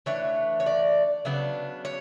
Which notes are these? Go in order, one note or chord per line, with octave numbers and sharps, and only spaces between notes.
E3 A3 D4 C#5
C#5
D5
C#3 F#3 B3 D4
C#5